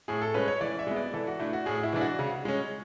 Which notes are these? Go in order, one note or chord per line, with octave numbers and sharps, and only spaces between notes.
A2 G#4
A4
G#3 C#4 B4
C#5
E3 D5
E5
G#3 B3
D5
E3 A4
F#4
A3 D4 E4
F#4
A2 G#4
E4
E3 G#3 D4
F#4
C#3
G#3 C#4